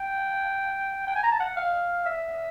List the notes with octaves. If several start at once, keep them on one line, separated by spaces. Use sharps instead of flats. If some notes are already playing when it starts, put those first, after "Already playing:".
Already playing: G5
G5
G#5
A#5
A5
F#5
F5
E5